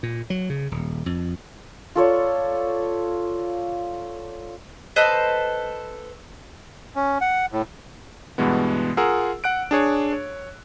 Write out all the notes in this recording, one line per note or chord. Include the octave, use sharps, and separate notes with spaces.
A#2
F#3
C#3
D#1
F2
F4 A4 C#5 D5
A4 B4 C5 D#5
C#4
F#5
A2
G2 B2 E3 G#3 B3
F4 G#4 A#4 F#5 E6
F#5 F#6 D7
D4 G#4 C#5
C#5